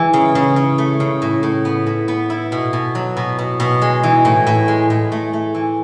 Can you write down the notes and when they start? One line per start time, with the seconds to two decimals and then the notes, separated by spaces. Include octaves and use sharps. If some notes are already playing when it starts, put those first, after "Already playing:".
Already playing: E3 G#3
0.13 C#3
0.35 C#3
0.56 C#3
0.78 A3
1.00 C#3
1.22 A2
1.43 A2
1.65 B3
1.87 A2
2.08 B3
2.30 E4
2.52 B2
2.73 B2
2.95 F#3
3.17 B2
3.39 B2
3.60 B2
3.82 G#3
4.03 E3
4.25 A2
4.47 A2
4.68 G#3
4.90 A2
5.12 A3
5.33 A3
5.55 E3